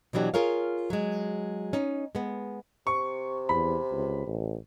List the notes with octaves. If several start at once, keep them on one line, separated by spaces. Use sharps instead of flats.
B2 E3 F#3 D4 G4
F4 G#4 A#4 C#5 F5
F#3 G#3
C#4 D#4
G#3 B3
C3 C#6
E2 B5
C#2
A1